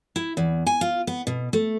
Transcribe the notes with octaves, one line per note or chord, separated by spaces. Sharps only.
E4
E2
G#5
F4
B3
B2
A3